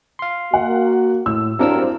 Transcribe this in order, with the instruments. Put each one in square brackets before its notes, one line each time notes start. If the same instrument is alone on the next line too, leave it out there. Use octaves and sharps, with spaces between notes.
[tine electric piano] F5 C6
[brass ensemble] A#3 F#4 [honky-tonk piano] F#5
[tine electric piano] A2 [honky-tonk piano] E6
[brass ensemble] G2 [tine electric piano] F#3 A#4 E6 [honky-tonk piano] C4 D4 E4